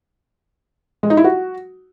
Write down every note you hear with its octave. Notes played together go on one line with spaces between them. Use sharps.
G#3
D#4
E4
F#4